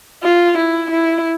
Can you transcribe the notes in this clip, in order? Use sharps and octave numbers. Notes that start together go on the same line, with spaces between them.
F4
E4
E4